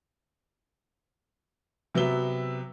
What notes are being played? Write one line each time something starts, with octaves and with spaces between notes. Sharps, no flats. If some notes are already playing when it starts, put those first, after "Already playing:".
C3 F#3 B3 E5 G7